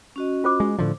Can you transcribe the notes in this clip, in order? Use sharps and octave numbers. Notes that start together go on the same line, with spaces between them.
C#4 F#4 D#5
F4 C5 D6
G#3
A2 D3 F3